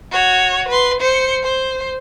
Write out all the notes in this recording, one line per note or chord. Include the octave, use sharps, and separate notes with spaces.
F#4 C#5
B4 C6
C5 C#7
C5